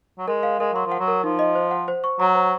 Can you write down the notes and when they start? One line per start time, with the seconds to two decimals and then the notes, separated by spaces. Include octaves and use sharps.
0.18 F#3
0.28 G#3 A#4
0.43 F5
0.59 G#3 A#4
0.73 F#3 C6
0.86 F3
0.92 F#5
0.99 F#3
1.08 A#4
1.24 F3 D#4
1.39 D#5
1.55 C5
1.71 F#5
1.88 C5
2.04 C#6
2.20 F#3 A#5
2.35 C5